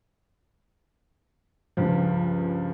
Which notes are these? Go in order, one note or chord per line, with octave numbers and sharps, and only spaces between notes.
C#2 G2 F3